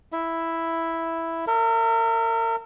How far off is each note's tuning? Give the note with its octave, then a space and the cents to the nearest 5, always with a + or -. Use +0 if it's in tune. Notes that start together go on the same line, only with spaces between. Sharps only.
E4 +0 E5 +0
A#4 -35 E5 +0